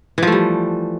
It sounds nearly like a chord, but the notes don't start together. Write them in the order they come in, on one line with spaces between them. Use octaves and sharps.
E3 F3 A3 G3